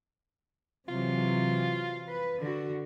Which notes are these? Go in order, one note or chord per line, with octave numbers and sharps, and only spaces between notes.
C3 E3 F#3 F4
B4
D3 F#4